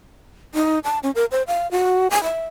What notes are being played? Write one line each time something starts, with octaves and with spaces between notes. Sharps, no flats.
D#4
A5
C#4
A#4
C5
F5
F#4
G#5
E5